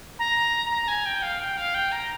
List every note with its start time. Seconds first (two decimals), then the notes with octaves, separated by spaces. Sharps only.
0.19 A#5
0.70 A#5
0.88 G#5
1.06 G5
1.23 F5
1.39 G5
1.57 F5
1.74 G5
1.92 A#5